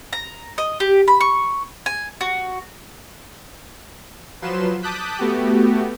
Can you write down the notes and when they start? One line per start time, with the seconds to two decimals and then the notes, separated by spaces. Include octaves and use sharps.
0.13 A#5
0.58 D#5
0.80 G4
1.08 B5
1.21 C#6
1.86 G#5
2.21 F#4
4.42 F3 F#3 B4 C6 E7
4.82 A5 D6 D#6 F#6 G6 B6
5.18 A3 B3 F#4 G4